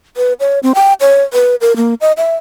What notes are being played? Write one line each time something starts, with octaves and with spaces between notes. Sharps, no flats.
B4
C#5
C4
G5
C#5
B4
A#4
A#3
D#5
E5